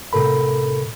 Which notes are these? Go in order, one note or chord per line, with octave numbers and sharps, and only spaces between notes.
A2 C3 A4 A#4 B5